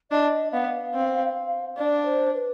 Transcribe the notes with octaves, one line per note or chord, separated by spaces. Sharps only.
D4 D#5
B3 F5
C4
D4 D5
C5
B4